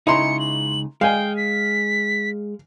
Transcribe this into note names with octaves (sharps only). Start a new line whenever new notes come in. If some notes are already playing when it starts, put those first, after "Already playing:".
C#2 C#3 D#4 E4 A#5 C6 C#7
F#7
G#3 F5 G5 G#5
B6